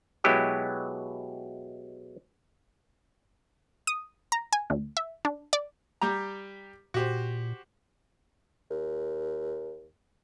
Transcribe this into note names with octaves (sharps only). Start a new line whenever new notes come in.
B2 F#3 G#3 E4 G4 G5
D#6
A#5
G#5
D2
E5
D4
D5
G3 G4 A#5
A#2 F#4 G4 C5
D#2